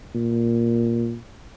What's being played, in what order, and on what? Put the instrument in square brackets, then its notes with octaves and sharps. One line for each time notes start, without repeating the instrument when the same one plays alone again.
[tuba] A#2